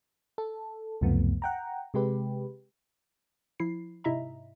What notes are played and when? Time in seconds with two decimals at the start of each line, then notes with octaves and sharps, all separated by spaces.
0.38 A4
1.01 C#2 F#2 C3 F3 A3 B3
1.42 F#5 G5 A#5
1.94 C3 G#3 G4 B4
3.60 F3 E4 C7
4.04 G#2 C3 E4 D#5 E5 A#5